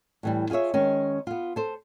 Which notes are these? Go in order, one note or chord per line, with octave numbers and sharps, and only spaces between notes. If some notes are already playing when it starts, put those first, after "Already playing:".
A2 E3 G3
F4 G#4 B4 C#5 E5
D#3 G#3 C#4
B3 F4
A4 C5